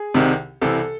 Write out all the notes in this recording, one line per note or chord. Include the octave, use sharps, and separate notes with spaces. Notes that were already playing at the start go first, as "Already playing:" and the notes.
Already playing: G#4
C2 C3 D#3
C2 C3 E3 A4